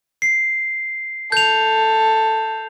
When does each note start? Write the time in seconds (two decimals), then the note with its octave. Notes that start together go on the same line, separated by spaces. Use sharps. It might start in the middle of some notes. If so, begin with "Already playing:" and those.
0.22 C7
1.32 A4 G6 F7